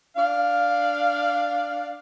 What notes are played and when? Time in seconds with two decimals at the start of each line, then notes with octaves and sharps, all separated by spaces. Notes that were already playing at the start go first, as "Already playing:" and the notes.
0.17 D4 D5 F5